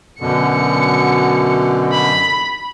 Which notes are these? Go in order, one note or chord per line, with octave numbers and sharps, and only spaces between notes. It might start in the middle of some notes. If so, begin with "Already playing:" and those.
F#2 B2 D3 C#7
B5